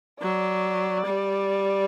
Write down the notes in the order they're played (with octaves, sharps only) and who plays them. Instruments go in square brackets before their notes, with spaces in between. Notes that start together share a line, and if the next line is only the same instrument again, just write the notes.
[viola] F#3 [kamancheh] D5
[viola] G3